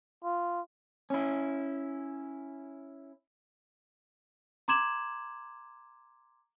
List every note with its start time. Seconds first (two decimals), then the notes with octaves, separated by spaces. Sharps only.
0.24 F4
1.10 C#4 E4
4.68 A#5 C6 D6 G#6 E7 F#7